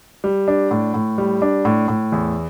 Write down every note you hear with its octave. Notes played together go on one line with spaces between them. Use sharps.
G3
D4
A2
A2
G3
D4
A2
A2
E2